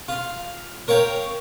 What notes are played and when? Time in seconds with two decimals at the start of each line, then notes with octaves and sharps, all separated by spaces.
0.08 F4
0.88 A#4 C#5 F5 G5